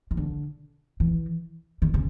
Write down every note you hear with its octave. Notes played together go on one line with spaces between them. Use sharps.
D#3
D3
E3
D#3
C#3